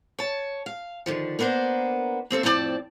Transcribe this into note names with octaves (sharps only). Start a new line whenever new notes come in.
C#5 A5
F5
D3 D#3 F3
A#3 B3 D4 A#4 C5
A#3 C4 A4 E5
F2 A2 C4 D4 D5 A5